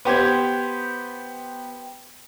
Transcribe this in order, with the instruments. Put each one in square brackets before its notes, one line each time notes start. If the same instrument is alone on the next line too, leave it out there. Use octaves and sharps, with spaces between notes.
[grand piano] B3 G4 C5 G#6